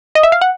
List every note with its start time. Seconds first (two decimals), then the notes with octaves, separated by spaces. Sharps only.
0.15 D#5
0.23 E5
0.32 F5
0.41 F#5